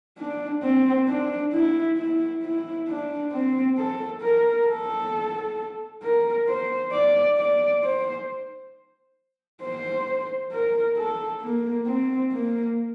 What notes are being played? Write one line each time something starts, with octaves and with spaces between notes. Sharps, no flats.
D4
C4
D4
E4
E4
E4
D4
C4
A4
A#4
A4
A#4
C5
D5
D5
C5
C5
A#4
A4
A#3
C4
A#3